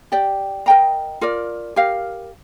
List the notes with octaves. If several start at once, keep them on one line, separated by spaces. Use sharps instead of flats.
G4 D5 G5
A#4 D#5 G5 A#5
F4 A#4 D5
G4 A#4 F5